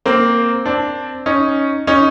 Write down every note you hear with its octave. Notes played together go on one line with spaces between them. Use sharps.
A#3 C4
C4 D4
C#4 D#4
C#4 D#4